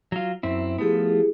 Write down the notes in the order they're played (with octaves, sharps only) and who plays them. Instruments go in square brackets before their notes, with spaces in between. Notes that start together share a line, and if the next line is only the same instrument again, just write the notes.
[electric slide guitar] F#3 F4
F#2 C4 E4
[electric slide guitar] F3 A3 B3 [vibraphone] E4 G4 G#4